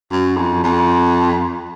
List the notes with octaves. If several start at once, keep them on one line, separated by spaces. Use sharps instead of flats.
F#2
F2
F2